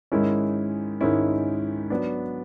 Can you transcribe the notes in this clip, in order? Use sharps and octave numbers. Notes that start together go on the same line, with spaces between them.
G#2 D#3 G#3 C#4 E4
G#2 D#3 G#3 C#4 E4
F#3 B3 D4